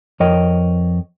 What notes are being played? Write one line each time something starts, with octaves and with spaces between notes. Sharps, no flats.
F2 A#4 C#5 D#5 G5